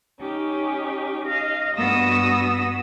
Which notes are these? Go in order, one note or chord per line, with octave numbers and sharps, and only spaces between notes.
C#4 D#4 G4
D#5 F5
G2 B3 F#4 D#6 E6 A#6